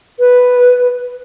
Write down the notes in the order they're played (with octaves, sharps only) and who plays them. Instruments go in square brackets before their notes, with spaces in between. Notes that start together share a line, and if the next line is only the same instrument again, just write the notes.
[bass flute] B4